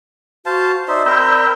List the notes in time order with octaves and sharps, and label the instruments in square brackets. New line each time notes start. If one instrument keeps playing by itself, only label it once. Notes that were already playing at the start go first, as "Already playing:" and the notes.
[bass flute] F#4 [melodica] C5 F5 A5
[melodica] D#4 C5 E5 [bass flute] D5
[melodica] C4 A#4 [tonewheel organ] B5 E6 G6